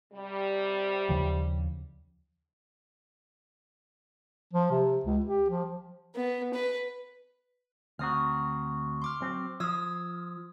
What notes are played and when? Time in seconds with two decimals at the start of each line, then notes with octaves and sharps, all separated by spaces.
0.13 C3 G3
1.09 D#2 C#3 F3
4.54 F3
4.71 C3
5.05 C#2
5.25 G4
5.50 F3
6.15 B3
6.54 B4
7.99 D2 C4 F#4 A#5 D#6 F6
9.02 C6 D6 F6
9.22 F#3 C4
9.60 F3 D#6 E6 G#6